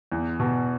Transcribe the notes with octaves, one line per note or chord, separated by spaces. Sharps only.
E2
B2